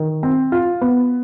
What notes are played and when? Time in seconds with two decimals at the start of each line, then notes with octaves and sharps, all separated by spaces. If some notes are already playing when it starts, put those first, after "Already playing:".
Already playing: D#3
0.23 C4
0.52 F4
0.81 B3